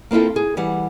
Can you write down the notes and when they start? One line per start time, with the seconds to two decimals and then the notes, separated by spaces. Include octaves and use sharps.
0.11 A#3 C4 E4 F4 A4
0.36 G#4
0.57 E3 G3 F#5